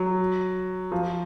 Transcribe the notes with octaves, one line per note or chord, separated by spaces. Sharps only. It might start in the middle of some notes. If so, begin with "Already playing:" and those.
Already playing: F#3
F3